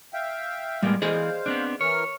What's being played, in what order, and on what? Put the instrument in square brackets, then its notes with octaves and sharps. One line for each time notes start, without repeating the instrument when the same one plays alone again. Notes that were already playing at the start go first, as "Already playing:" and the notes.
[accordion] E5 F5 G5
[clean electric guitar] A2 A#3 B3 [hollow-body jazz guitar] G3 G#3
[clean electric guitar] E3 [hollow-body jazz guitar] G#4 D5 D#5 [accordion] C5 F5
[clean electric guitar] B3 C4 D4
[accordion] E3 A#4 F6 [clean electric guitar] C#5